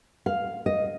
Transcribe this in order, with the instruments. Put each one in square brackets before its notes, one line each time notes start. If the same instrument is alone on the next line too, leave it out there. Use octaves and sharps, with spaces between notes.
[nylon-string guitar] F5
D#5